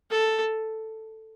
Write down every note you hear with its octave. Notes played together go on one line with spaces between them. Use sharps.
A4